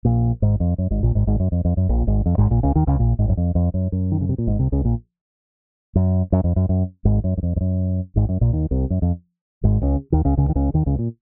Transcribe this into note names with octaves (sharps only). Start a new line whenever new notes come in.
A#1 A#2
G#1 G#2
F2
F#2
G#1 G#2
A#1 A#2
G#1 G#2
G#1 G#2
F#2
F2
F2
F#2
A#1 A#2
G#1 G#2
F2
G#1 G#2
A#1 A#2
C#2 C#3
D#2 D#3
C#2 C#3
A#1 A#2
G#1 G#2
F#2
F2
F2
F#2
F#2
D#3
C#3
C3
A#2
G#1 G#2
C2 C3
C#2 C#3
A#1 A#2
F#2
F#2
F2
F#2
F#2
G#1 G#2
F#2
F#2
F2
F2
F#2
G#1 G#2
F#2
A#1 A#2
D#2 D#3
C2 C3
F#2
F2
G#1 G#2
C#2 C#3
D#2 D#3
C#2 C#3
C#2 C#3
D#3
C#2 C#3
D#2 D#3
C#2 C#3
A#2